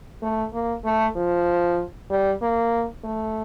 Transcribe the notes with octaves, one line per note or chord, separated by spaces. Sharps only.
A3
A#3
A3
F3
G3
A#3
A3